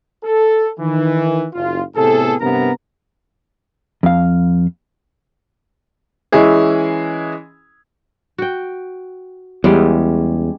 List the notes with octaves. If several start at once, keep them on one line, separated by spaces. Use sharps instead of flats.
A4
D#3 E3
F#1 F4
A2 C3 B3 G#4 A4
G2 C3 B3 A#4 A#5
F2 F5
E3 G#3 C#4 E4 G#4
F#4 G5
E2 G3 G#3 C#4